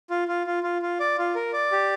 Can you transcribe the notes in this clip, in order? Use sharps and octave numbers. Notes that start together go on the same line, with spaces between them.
F4
F4
F4
F4
F4
D5
F4
A#4
D5
G4